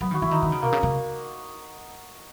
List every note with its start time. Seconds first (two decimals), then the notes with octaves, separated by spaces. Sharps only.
0.01 F#3 B3
0.11 D#3
0.14 F#4
0.22 E3 E4
0.31 D#3 D#4
0.42 D#3 B3
0.52 C#3
0.62 B2 A#3
0.73 C#3
0.83 C#3